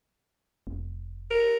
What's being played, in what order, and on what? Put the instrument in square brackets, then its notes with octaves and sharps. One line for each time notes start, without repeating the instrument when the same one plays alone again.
[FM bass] F1
[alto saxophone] A#4